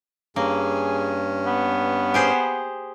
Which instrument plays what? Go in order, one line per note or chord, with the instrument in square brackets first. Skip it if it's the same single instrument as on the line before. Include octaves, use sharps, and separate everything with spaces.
[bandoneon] G2 C#4 [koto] A#3 [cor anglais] G#4
[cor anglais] B3
[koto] G4 G#4 C5